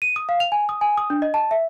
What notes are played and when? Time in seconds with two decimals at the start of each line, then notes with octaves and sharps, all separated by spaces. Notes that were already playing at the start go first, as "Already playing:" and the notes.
0.02 D#7
0.16 D#6
0.29 F5
0.40 F7
0.52 G#5
0.69 D#6
0.81 G#5
0.97 D#6
1.10 D4
1.22 D#5
1.34 A5
1.51 E5